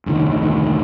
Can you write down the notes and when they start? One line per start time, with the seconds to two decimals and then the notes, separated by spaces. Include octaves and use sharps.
0.06 F1 D2 A2 D#3